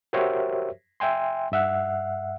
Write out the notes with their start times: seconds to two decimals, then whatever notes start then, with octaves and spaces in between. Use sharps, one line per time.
0.13 F#4 G4 A#4 C5 C#5 E5
1.00 E5 G5 G#5 C6
1.52 G2 E5 F#5